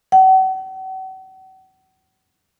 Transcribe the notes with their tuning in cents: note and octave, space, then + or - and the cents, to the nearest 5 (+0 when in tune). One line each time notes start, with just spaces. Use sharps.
F#5 +40